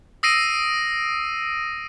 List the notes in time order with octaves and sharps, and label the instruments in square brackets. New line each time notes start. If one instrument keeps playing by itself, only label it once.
[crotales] D#6 E6 A#6 C7 D7 D#7